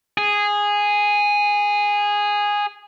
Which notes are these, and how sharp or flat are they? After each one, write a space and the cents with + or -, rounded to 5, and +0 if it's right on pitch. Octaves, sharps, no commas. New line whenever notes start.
G#4 -10